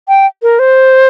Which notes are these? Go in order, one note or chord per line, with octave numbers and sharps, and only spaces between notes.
G5
A#4
C5